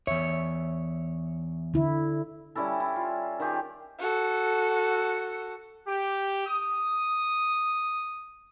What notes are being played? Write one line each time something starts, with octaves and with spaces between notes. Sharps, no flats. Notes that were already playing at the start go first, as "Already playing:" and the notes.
E2 C#5 E5
D3 E4
G3 C#4 E4 A4
E4
F4
D#3 F4 G4 G#4
F#4 A4
G4
D#6